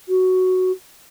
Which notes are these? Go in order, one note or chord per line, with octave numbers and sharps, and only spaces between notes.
F#4